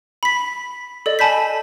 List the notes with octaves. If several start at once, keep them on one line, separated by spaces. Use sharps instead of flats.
B5 B6
A4 D5 D#5
G#5 A5 B5 G6 B6